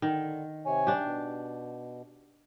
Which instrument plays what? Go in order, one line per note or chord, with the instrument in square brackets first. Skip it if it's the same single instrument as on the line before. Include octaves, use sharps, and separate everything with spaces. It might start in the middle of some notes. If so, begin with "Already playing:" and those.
[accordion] D3 [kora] D#3
[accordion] C3 C#5 G#5
[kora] D4 G4
[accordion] B2